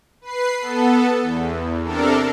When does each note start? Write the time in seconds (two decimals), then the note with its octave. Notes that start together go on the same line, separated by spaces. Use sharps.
0.21 B4 C7
0.61 B3 A4
1.22 E2
1.85 C3 D4 A4 A#4